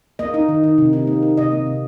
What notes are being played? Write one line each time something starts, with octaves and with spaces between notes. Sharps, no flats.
A#3 D#5
D#4
D#3
D#3
C3
D#4
A#3
D#4
C3 D#5
A#3
C3